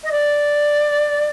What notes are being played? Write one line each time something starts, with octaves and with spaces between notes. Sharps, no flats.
D#5
D5